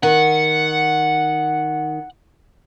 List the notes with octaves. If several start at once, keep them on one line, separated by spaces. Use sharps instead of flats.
D#3 F#5